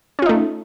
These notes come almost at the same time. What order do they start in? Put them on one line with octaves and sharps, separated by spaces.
C#4 F4 D#4 A3